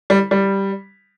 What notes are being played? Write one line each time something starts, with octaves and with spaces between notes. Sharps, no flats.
G3
G3